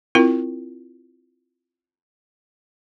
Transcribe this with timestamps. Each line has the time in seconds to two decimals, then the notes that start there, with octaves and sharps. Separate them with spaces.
0.15 C4 E4 F4 A#4